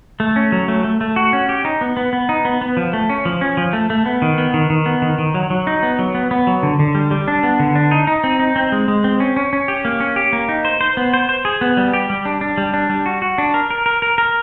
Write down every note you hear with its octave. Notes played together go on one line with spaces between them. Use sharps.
A3
C#4
F#3
A3
A3
A3
F#4
C#4
G4
D#4
B3
B3
B3
D#4
B3
B3
F3
A3
C#4
F3
C#4
F3
A3
A3
B3
D#3
B3
D#3
D#3
B3
D#3
D#3
F#3
F#3
D#4
B3
F#3
B3
B3
F#3
D3
D3
G3
G3
D4
B3
D3
D4
D#4
D#4
C4
D#4
C4
G#3
G#3
C4
C#4
C#4
C#4
G4
A#3
C#4
G4
A#3
D#4
C5
C5
B3
C5
C5
G#4
B3
G3
G4
G3
D4
D4
G3
D4
G3
F#4
F#4
D4
A#4
A#4
A#4
A#4
A#4